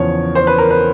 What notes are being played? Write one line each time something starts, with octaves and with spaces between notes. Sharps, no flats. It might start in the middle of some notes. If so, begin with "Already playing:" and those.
Already playing: E2 C#3 F3 C#5
C5
B4
A#4
B4